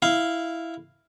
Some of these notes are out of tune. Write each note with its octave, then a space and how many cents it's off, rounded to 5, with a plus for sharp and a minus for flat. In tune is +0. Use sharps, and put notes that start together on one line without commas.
E4 +0 F5 -5